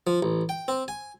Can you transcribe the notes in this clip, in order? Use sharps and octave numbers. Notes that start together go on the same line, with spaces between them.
F3
A1
G5
C4
G#5